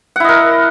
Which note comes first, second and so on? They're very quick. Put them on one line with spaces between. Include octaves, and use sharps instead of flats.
F#5 E4 D#5 A#4